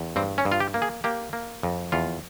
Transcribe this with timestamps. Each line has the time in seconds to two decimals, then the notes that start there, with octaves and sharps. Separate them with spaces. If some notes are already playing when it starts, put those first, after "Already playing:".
Already playing: E2
0.16 G2 C4
0.38 C#4
0.45 G2
0.52 F4
0.60 G4
0.74 A#3
0.82 G#4
1.04 A#3 G4
1.33 A#3
1.63 F2
1.92 E2 F4